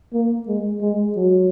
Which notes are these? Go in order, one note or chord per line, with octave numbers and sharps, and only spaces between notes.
A#3
G#3
G#3
F#3